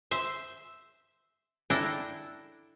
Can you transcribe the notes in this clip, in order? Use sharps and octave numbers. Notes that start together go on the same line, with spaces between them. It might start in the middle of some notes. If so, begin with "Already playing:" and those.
C5 E5
D4 E4 A4 G5 A#5